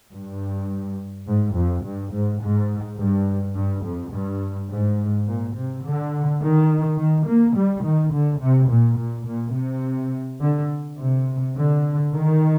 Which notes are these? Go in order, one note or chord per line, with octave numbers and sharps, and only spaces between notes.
G2
G#2
F2
G2
G#2
G#2
G2
G2
F2
G2
G#2
A#2
C3
D3
D#3
D#3
A#3
G3
D#3
D3
C3
A#2
A#2
A#2
C3
D3
C3
D3
D#3